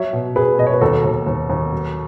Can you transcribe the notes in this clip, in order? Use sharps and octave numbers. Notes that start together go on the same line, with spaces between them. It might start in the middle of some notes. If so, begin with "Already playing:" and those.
Already playing: F#3 C#5 E5
B2
B2 G#4 B4
B2 D#5
C#5
B4
D#2 F#4 A4
D#2
D#2
D#2
F#3